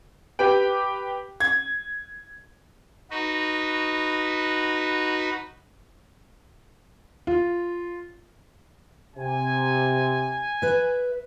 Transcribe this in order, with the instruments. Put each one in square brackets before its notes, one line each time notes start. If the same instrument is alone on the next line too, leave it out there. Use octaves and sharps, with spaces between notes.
[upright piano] G4 B4 G5
G#6
[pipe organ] D#4 F#4 B4
[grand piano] F4
[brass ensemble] C3 [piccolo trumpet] G#5
[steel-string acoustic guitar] B4 E5